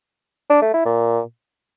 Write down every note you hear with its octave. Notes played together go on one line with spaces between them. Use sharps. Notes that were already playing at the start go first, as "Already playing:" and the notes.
D4
A3
E4
A#2